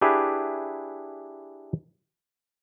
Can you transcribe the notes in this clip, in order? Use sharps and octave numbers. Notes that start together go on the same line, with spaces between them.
D4 E4 G4 G#4 B4